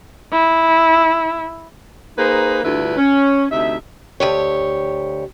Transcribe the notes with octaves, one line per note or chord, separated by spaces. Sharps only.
E4
A#3 D#4 G#4 B4 C5
D2 G2 D3 E4 F4 B4
C#4
D2 C3 D#4 E5
D2 G4 C#5